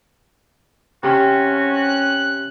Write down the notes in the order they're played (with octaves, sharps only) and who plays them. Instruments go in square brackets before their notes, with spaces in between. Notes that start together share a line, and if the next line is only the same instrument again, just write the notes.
[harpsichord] C3 [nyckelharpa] C#4 [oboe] F#4
[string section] F#6